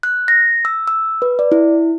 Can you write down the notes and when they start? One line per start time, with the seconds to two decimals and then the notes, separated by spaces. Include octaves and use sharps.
0.03 F#6
0.28 A#6
0.65 E6
0.88 E6
1.22 B4
1.39 D5
1.52 E4